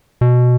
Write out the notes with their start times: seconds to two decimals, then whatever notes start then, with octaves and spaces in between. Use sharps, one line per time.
0.21 B2